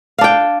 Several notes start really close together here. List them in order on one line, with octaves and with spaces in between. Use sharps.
F5 D4 G5